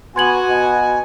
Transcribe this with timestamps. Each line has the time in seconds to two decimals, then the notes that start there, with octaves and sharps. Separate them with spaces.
0.16 B3 F#4 G#5 C6 G#6 F#7
0.48 B2